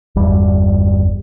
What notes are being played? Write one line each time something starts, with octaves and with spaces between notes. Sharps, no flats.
G1 E2 G3